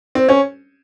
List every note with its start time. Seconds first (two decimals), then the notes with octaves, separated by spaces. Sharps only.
0.15 C4
0.29 C#4